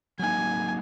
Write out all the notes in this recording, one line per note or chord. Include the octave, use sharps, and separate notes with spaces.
F#3 A#3 D#4 G#5